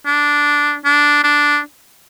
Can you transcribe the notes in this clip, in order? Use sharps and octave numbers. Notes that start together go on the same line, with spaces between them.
D4
D4
D4